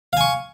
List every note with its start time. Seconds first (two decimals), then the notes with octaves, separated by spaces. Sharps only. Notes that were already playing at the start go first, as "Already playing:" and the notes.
0.13 F5
0.17 G#5
0.21 C#6